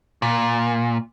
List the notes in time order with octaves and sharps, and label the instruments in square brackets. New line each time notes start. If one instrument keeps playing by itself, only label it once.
[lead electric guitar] A#2